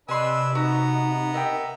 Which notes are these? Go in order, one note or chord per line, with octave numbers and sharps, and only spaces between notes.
C3 D4 B4 D#5 G#5 C6 E6
B3 D#4 F#4 A#5
A#4 D#5 E5 G5